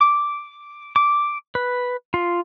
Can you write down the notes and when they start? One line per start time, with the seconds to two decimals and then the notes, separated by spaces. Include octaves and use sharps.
0.01 D6
0.96 D6
1.55 B4
2.14 F4